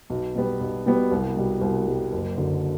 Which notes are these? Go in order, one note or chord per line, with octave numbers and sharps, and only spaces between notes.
B1
B2 G3 B3
B1
B2 G3 B3
C2
B2 G3
C2
B2 G3
F#1
F#2 D3